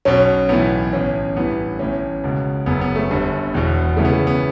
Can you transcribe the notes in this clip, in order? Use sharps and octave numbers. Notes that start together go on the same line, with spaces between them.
B1 B2 C#4
B1 A2 E3 B3
A1 A2 E3 C#4
A1 G2 E3 B3
A1 A2 E3 C#4
C#2 B2
F#1 F#2 C#3 B3
B3
A3
G1 G2 D3
E1 E2 B2
C#2 C#3 E3 A3
B3
A3
B3